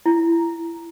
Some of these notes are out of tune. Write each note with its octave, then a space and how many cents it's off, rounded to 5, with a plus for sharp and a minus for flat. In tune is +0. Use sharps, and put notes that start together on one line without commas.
E4 +25